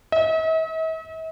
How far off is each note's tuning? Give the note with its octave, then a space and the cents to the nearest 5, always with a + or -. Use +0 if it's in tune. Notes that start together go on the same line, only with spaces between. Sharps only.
E5 -45